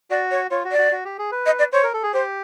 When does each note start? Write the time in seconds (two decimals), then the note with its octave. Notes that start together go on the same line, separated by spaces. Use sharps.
0.10 F#4 D5
0.31 C#5
0.51 F4 C#5
0.65 F#4
0.72 D5
0.78 F#4
0.92 F#4
1.05 G4
1.18 G#4
1.32 B4
1.46 D#5
1.59 D5
1.72 C5 C#5
1.83 A#4
1.94 A4
2.03 G#4
2.13 G4 C5